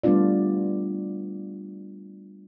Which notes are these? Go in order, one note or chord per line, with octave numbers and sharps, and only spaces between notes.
G3 A3 B3 D4 F4 D5